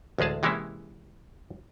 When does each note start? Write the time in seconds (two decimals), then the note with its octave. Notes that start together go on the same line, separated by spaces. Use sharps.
0.18 A1 D2 G#3 G#4 A5
0.43 C3 E3 G#3 A#3 C#4 E4